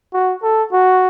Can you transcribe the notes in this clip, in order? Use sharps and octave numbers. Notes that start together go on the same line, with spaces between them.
F#4
A4
F#4